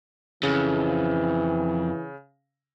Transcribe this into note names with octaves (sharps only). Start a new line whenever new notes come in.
F2 C#3 E3